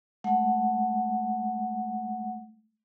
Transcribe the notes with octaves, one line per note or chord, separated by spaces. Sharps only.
G#3 A3 F#5